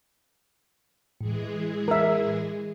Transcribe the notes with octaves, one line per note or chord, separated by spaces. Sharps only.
A2 E3 G#3 G#4
A#4 E5